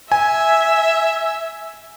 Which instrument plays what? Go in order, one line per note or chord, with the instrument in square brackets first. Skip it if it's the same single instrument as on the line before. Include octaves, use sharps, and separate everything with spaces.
[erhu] E5 [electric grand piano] G#5